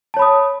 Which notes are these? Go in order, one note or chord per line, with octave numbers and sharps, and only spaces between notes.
C#5 A5 B5 D#6